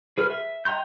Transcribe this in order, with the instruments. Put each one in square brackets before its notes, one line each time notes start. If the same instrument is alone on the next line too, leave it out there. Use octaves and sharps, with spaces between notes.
[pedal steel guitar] G#4 B4 F6
E5
D#5 G5 A#5 C6 G6